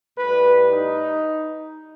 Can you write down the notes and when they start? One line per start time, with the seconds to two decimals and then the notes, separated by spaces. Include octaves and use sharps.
0.17 A2 G3 B4
0.69 D#4